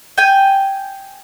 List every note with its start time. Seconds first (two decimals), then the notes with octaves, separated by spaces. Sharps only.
0.18 G5 G#5